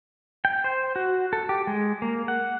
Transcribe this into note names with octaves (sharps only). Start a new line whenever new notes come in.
G5
C5
F#4
A4
G4
G#3
A#3
F#5